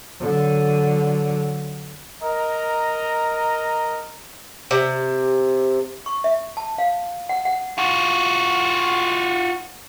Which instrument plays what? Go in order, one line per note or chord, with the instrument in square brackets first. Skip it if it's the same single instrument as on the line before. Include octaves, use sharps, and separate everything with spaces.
[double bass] D3 F#3
[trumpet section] A#4 D#5 A#5
[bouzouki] C3
[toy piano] C#6
E5
A5
F5
F#5
F#5
[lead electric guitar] F4 F#4